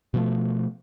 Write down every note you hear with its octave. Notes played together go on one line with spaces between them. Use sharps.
B2 F3 A3